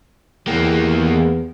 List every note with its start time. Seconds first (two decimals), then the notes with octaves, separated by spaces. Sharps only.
0.47 E2 A#3 G4